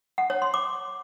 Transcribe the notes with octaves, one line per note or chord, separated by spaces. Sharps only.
F#5
C#5
C6
D6